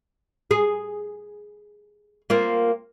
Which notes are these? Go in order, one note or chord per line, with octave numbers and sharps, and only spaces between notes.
G#4
A#3 C4 F4